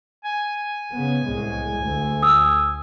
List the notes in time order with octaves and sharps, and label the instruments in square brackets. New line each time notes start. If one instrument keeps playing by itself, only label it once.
[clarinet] G#5
[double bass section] C#3 B3
C2 A2 G#3
D2
[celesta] D#6 E6